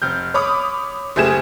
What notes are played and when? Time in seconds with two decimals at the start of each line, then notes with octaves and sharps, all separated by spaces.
0.02 F1 F6 G6
0.34 C#5 B5 D6 D#6
1.16 F#1 A3 G4 G#4 G#6 E7